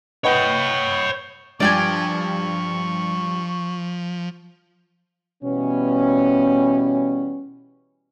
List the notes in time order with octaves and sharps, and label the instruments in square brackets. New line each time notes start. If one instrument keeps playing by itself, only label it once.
[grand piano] B4 D#5 F#5 [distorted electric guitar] C#5 G5
[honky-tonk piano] G2 G3 [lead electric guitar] F3 [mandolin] D5 G5 G#5 [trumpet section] C#6
[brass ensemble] B2 E3 G3 B3 C#4